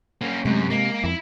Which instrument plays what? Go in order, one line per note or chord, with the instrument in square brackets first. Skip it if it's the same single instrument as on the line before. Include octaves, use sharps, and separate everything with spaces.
[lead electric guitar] A#3 C#4
[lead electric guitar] F#2 [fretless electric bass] C3 [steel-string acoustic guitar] G#3 A3
[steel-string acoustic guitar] G#3 D#5 G#5 [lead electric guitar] A#3
[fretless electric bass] F2 [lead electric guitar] E4